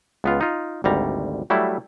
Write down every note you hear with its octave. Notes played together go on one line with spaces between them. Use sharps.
C#2 B3 F4
D#4 F4
G#1 D2 G3 A#5
F#3 G3 A3 E4